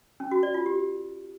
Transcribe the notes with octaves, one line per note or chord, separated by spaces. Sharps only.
C#4
F#4
D5
F4
G4